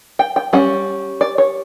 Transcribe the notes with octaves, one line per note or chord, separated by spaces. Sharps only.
G5
G5
G3 C#4 F#5
D5
C#5